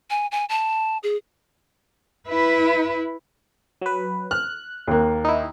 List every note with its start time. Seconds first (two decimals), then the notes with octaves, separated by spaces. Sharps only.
0.10 G#5
0.32 G#5
0.49 A5
1.03 G#4
2.28 E4 B4
3.82 F#3 B4
4.31 F6 F#6
4.88 D#2 A#3
5.25 D#4 E4